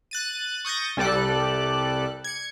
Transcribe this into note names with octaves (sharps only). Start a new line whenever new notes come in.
F#6 A6 D#7
C#6 D#6 G6 A6 A#6
C2 G3 A4 D5 F#6
G#6 C#7